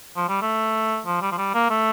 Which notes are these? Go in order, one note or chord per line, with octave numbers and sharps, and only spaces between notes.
F3
G3
A3
F3
G3
F3
G3
A#3
A3